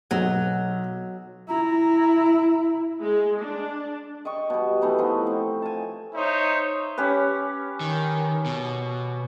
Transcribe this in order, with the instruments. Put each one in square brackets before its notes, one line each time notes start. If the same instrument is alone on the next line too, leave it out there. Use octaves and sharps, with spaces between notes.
[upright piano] B1 [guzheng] F#3
[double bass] E4 [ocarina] A#5
[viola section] G#3
D4
[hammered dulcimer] D#5 G5 C#6
B2 G3
E3 A3 B3 D#4
F3 B3 D#4 C6
C4
G#5 A5
[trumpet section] D#4 C5 C#5 E5
[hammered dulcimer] C#4 G4 B4
[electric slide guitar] D#3
B2